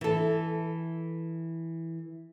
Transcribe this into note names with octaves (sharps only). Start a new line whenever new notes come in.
E3 A4